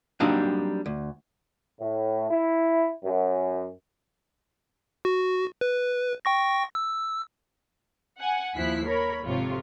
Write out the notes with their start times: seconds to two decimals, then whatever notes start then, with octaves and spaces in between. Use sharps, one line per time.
0.20 F#3 G3 A#3 C4 D4 D#4
0.86 D2
1.80 A2
2.31 E4
3.04 F#2
5.05 F#4
5.61 B4
6.25 G5 C#6 A#6
6.75 E6
8.19 F#5 G#5
8.56 D#2 F3 E4 F#6 B6 C7
8.86 A#4 C#5 B5
9.23 G#1 F2 C3 F4 C#5